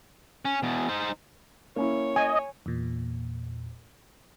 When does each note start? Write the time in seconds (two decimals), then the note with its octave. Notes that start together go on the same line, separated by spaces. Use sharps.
0.45 C#4
0.63 E2 B2
0.89 D#4 C5
1.76 A#3 C#4 E4 C#5
2.16 D#5 G#5
2.66 E2 A#2